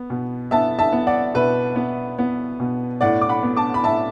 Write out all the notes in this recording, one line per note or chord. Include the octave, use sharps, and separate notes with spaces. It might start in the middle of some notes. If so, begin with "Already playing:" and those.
Already playing: B3
B2
B3 E5 A5
E5 A5
B3
D5 F#5
B2 B4 E5
B3
B3
B2
A2 D5 F#5
D6
F#5 B5
B3
A5 D6
B5
A2 E5 A5